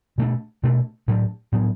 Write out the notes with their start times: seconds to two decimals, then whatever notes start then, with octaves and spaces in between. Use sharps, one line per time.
0.18 B2 A3 D4
0.63 B2 A3 D4
1.08 A2 F#3 B3 D4
1.52 A2 F#3 B3 D4